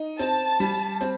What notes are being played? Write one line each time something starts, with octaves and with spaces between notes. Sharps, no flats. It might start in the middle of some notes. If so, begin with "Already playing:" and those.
Already playing: D#4
C4 A5
G3
C4